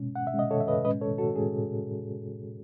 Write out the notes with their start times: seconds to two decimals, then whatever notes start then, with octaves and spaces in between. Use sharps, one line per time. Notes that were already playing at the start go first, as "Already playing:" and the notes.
Already playing: B2 G#3 C#4
0.16 F#5
0.27 E5
0.34 B2 G#3 C#4
0.39 D#5
0.51 A4 C#5
0.60 E5
0.68 B4 D#5
0.85 A2 G#3 C#4 B4 D#5
1.01 A4 C#5
1.18 F#4 A4
1.35 A2 G#3 C#4 G#4